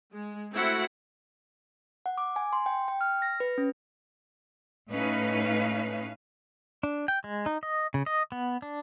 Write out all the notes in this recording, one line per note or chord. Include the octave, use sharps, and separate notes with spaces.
G#3
A3 C4 E4 F#4 F#5
F#5
D6
G#5
C6
G5
G5
F6
A#6
B4
C#4
A2 A3 C#4 D#4 B4 F5
D4
G5
G#3
D#4
D#5
C#3
D#5
B3
D4